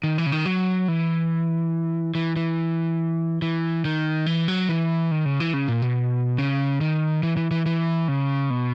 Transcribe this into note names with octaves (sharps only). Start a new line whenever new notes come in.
D#3
E3
C#3
D#3
F#3
E3
E3
E3
E3
D#3
E3
F#3
E3
D#3
C#3
E3
C#3
A#2
B2
C#3
D#3
E3
E3
E3
E3
C#3
B2